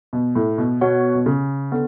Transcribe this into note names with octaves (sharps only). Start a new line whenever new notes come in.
B2
A2
B2
B2 B3 F#4 C#5 F#5
B2
C#3
D3 B3